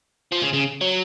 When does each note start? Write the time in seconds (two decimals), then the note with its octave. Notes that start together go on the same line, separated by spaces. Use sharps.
0.32 F3
0.42 C#3
0.53 C#3
0.81 F#3